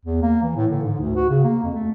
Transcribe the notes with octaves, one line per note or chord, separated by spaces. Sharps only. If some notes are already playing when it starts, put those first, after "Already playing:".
E2
A#3
E3
A2
D3
G#2
D2
F#4
C#3
A#3
F2
A3